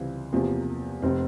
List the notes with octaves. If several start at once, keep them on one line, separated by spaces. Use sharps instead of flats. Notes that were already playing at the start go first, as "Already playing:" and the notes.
Already playing: C#2 C3 E3 G3 C4
E2 C3 F3 A#3
F1 C3 C4